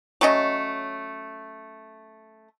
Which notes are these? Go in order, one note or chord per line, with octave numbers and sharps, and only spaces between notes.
F#3 A3 C#4 D#5